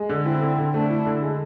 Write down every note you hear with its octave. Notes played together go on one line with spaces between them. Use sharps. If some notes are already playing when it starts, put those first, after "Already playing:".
Already playing: G#3
D3
C4 E4
D3
D3
A3 D4
E4
D3
G#3